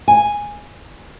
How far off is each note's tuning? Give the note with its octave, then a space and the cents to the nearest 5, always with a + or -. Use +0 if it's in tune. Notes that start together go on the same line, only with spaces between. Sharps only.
G#5 -5